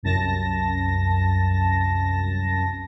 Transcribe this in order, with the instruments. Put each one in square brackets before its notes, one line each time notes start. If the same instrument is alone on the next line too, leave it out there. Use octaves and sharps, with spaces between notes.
[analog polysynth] C2 F#2 A5 A#6